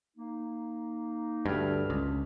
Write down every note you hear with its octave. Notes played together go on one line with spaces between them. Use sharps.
A#3 D#4
D2 G2 A4 B5 F6
C#2